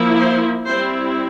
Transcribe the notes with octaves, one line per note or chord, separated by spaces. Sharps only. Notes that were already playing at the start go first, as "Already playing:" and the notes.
Already playing: F3 A#3 E4
C5
G3 C4 E4 C5